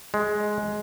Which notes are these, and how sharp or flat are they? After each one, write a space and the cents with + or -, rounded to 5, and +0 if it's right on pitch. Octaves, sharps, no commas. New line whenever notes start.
G#3 +10